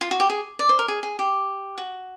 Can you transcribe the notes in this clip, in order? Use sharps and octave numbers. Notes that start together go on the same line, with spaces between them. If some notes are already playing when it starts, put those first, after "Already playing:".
F4
F#4
G4
G#4
D5
C5
A#4
G#4
G#4
G4
F#4